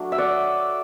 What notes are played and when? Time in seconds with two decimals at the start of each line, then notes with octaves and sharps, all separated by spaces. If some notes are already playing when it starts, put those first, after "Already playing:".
Already playing: F#3 A3 D4
0.12 E5
0.18 D5 F#5